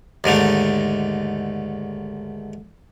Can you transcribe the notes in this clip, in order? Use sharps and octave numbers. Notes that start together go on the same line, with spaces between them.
D#2 G#2 D3 A3